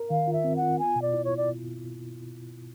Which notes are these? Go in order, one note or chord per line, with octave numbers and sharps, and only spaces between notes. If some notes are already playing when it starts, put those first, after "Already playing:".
Already playing: A#4
D#3 F5
F4
E5
C4
F#5
F4
B3 G#5
B2
D5
E4
C#5
E4
D5